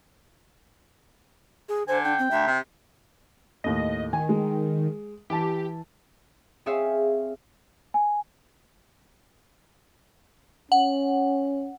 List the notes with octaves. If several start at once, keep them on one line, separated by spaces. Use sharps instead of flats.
G#4
D3 C5 G#5
D4 G5
C4
D2 E5
C3
D#2 A2 D#5
D#3 G#5
G#3
E3 G4 A5
C4 G#4 C#5 E5 F5
G#5
C#4 F#5